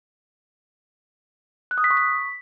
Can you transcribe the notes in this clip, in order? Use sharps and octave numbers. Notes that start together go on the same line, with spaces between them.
F#6
D#6
B6
C#6
B6